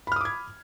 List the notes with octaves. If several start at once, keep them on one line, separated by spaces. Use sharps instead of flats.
B5 D6 D#6 F6 G#6